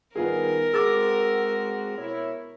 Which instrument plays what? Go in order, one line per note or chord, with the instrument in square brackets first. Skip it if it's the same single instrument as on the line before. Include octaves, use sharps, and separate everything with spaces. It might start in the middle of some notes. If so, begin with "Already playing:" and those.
[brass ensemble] D#3 G3 [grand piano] B3 F4 G#4 [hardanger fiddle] A#4
[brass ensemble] G#3 C4 F#4 [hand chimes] G#4 A6 [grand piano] D6 E6
[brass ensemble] B2 E4 C#5